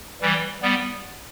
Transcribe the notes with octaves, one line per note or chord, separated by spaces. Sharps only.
E3 G3
G3 B3